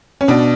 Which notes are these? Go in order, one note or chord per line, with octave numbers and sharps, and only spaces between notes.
C#4
B2 D4